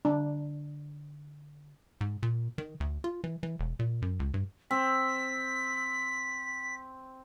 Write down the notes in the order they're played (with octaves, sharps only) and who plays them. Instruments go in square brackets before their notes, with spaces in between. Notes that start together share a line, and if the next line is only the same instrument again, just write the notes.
[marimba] D3 [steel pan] D4
[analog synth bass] G#2
A#2
D#3
D2
F4
E3
E3
E1
A#2
F#2
C#2
G2
[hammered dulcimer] C4 [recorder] B6